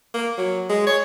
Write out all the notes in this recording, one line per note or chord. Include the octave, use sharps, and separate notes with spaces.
A#3
F#3
G#3
C#5